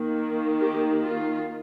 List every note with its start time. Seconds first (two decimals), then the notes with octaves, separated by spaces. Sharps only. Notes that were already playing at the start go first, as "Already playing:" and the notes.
Already playing: D#3 A#3
0.61 G4
1.01 F4